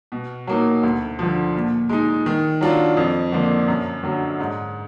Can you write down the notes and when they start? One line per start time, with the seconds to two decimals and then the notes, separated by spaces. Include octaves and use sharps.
0.12 B2
0.47 F#3 A#3 D#4
0.83 D2
1.19 D3 F3
1.55 A#2
1.89 G#3 D#4
2.26 D#3
2.61 F#3 D4 F4
2.97 F2
3.32 D3 F3 A#3 D4
3.68 F#2
4.03 D3 F#3
4.40 G#2